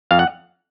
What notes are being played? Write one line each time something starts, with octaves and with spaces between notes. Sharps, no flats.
F2 F5
F#5